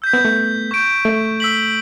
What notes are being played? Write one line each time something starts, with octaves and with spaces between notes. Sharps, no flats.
E6 G6 B6
B3
A3
C#6 G6 D7
A3
E6 B6 F#7